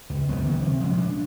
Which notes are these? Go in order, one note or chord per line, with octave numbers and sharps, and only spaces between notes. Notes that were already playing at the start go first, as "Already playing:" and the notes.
C#2
C#2 F#2 F#3 B3
D#3 F#3 A#3
C3
D#1 F3 G#3 C#4
D4